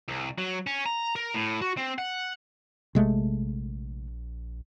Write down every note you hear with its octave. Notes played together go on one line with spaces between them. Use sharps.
C2
F#3
C#4
A#5
A#4
A2
F#4
C4
F#5
A#1 C3 G#3 A3